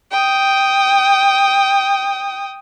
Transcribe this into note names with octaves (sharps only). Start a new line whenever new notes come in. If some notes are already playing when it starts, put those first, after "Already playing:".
G5 D#6